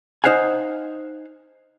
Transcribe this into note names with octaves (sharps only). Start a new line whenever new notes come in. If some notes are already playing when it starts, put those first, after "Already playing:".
D#4 C5 F5 F#5 G#5